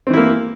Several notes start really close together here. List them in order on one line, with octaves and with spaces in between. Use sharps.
C4 E3 E4 A#3